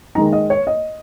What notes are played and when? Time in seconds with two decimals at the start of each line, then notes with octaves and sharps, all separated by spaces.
0.15 D#3 G#3 D#4 A#5
0.33 D#5
0.50 C#5
0.67 D#5